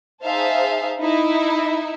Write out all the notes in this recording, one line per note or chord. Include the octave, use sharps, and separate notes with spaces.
D#4 G#4 C5 E5 F5 A5
D#4 E4 E5